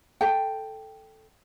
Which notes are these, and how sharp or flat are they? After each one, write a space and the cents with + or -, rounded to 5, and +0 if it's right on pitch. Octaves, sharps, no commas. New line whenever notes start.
A4 +0 G5 +0